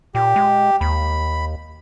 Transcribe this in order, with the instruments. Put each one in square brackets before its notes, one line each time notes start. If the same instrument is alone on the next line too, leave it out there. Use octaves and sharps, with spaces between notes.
[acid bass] A#2 [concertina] G4
[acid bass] G#3
[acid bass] D#2 [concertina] B5